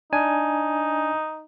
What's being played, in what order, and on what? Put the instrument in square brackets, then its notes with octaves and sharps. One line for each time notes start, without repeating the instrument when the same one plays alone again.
[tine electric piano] D4 G#5 [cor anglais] D#4